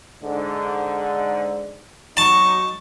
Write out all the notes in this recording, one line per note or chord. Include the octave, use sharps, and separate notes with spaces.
G#2 D3
F#3 D#4 A5 C#6